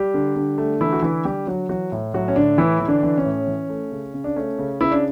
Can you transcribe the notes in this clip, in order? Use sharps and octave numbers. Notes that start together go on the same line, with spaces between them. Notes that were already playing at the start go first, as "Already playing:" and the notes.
Already playing: G3 G4
D3
D3
A3
D3 E3 E4
F#4
D3 E3 E4
D3 G3 G4
F#3 F#4
E3 F#3 F#4
A2
A2 F#3 F#4
C#4
A2 D3 D4
A2 E3 E4
E3
D3 D4
E3
C#4
A2
E3
A3
C#3
C#3
D4
A3 C#4
C#3
C#3 E4
D4